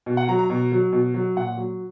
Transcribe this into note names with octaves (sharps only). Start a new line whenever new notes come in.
B2
F#5
F#3 A#5
A#5
B2
F#3
B2
F#3
A#2 F#5
F#3